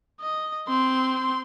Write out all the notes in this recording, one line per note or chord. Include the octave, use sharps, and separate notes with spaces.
D#5
C4 C6